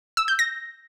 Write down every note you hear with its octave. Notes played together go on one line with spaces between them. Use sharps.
E6
G6
A#6